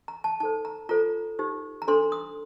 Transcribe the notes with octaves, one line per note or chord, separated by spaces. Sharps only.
A#5
A5
D#4 A4 C5 A5
A#5
F4 A4 C5 A#5
D#4 G4 C5
A#5
D4 A4 C5 C6
D#6